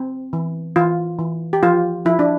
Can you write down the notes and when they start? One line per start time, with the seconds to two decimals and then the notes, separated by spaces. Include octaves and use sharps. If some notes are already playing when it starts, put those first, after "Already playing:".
Already playing: C4
0.33 E3
0.76 E3 F4
1.19 E3
1.53 G4
1.63 F3 F4
2.05 F3 E4
2.19 D4